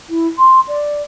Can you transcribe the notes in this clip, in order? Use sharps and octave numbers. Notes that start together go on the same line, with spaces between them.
E4
C6
D5